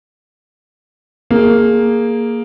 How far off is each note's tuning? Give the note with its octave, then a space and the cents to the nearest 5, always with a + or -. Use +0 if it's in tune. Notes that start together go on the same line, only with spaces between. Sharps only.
A#3 +0 G#4 +0